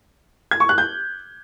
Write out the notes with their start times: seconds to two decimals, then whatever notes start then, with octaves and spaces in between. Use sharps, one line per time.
0.51 G#6
0.60 C#6
0.69 F#6
0.78 G6